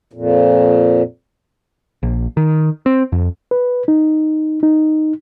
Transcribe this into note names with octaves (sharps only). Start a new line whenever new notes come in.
F2 A#2
A#1
D#3
C4
F2
B4
D#4
D#4